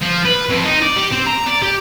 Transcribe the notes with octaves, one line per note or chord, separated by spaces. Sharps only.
F3
B4
F2
D#4
D5
G4
C4
A#5
D5
G4